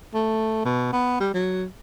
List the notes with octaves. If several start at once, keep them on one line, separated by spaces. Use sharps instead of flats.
A3
B2
B3
G3
F#3